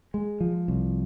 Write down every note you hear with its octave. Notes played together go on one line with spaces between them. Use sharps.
G#3
F3
C2